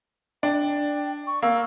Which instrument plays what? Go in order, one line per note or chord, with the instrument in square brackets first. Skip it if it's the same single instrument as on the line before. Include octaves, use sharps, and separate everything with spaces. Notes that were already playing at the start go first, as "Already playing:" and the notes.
[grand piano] D4 [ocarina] G5
[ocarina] C#6
[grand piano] A#3 [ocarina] E6